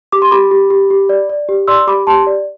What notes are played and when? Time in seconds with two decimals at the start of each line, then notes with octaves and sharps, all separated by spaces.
0.12 G4 D6
0.22 C6
0.31 G4 B5 D6
0.51 G4
0.70 G4
0.90 G4
1.09 D5
1.29 D5
1.49 G4
1.68 D5 C6 E6
1.87 G4 B5 D6
2.07 G4 A5 C6
2.27 D5